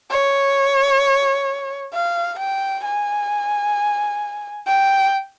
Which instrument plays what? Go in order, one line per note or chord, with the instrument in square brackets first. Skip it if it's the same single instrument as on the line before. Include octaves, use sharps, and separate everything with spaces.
[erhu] C#5
F5
G5
G#5
G5